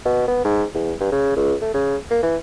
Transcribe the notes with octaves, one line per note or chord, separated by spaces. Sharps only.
B2
B3
G#2
E2
G2
C#3
C#2
A3
C#3
A#3
E3